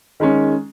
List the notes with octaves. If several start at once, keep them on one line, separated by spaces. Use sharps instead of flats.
D#3 G#3 C#4